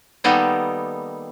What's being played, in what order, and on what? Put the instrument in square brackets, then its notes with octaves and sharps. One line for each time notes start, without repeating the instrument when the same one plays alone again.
[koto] D#3 G3 A#3 B3 D#4 A4